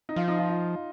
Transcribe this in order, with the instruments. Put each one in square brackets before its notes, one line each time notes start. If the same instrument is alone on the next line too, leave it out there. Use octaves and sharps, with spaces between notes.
[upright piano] D#4
[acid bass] F3 [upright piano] F4
[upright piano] D#4
F4
F4